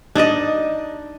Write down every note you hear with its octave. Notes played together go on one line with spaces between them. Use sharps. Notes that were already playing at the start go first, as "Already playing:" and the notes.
D4 D#4 D5 D#5